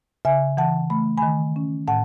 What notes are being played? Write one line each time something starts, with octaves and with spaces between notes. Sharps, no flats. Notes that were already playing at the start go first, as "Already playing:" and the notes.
C#3 E5 G#5
E3 F#5 A5
A3 B5
D#3 G#5 B5
C#4
A2 F#5 A5